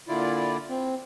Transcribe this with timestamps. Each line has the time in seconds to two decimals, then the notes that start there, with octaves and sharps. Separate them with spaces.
0.08 A#2 D3 E4 F4 D5
0.69 C4